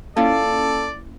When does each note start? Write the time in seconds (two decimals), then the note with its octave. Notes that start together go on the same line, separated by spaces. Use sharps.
0.17 A#3 C#4 E4 F4 A4 D5